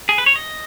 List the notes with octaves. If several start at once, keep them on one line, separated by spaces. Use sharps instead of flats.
G#4
B4
C#5
D#5